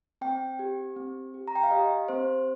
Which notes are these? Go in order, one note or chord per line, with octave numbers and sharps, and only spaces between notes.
C4 G5
G4
C4
G4
A#5
G5
F5
G4 D#5
C4 C5